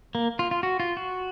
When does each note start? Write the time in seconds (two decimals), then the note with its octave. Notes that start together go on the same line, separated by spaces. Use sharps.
0.15 A#3
0.39 F4
0.51 F4
0.63 F#4
0.80 F4
0.97 F#4